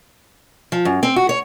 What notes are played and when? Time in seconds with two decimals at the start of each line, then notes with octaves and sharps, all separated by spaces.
0.72 F3
0.85 F#2
1.03 C4
1.16 F#4
1.29 C#5